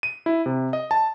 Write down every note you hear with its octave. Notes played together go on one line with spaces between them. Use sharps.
D#7
E4
C3
D#5
A5